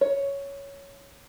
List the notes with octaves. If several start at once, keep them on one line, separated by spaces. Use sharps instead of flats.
C#5